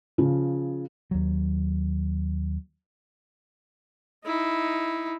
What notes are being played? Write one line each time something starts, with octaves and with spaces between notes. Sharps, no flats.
C#3 F3
D#2 F#3
D#4 E4